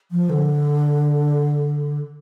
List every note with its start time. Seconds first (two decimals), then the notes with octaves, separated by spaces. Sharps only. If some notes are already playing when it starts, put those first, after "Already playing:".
0.11 F3
0.30 D3